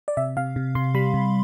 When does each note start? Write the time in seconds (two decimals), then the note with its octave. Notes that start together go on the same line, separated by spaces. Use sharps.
0.08 D5
0.17 C3 E5
0.37 C3 F5
0.56 C3
0.75 C3 C6
0.95 G3 B5
1.14 C3